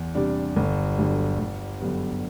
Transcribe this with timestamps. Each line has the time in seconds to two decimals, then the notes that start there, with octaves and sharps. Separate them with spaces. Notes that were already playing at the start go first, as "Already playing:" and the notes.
Already playing: E2
0.15 C3 G3 D4
0.56 G1
0.98 G2 D3 F#3
1.39 G1
1.80 F#2 D3 G3 B3